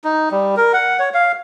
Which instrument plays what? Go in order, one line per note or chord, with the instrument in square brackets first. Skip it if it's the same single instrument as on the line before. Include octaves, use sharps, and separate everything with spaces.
[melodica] D#4
G3
A#4
F#5
C#5
F5